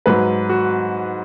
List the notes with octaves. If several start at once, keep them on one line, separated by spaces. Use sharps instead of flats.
G#2 F#3 B4
F#4